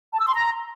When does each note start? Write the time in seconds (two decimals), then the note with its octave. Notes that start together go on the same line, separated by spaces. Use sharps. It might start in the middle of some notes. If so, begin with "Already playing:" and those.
0.12 A5
0.19 E6
0.27 C6
0.34 A#5